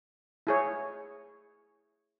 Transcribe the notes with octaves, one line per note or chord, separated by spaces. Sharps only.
E4 G#4 C#5